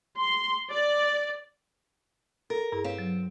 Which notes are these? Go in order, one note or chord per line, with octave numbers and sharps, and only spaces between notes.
C6
D5
A4 A#4
G2 E4 G#4
C4 B4 C#5 F5
F#3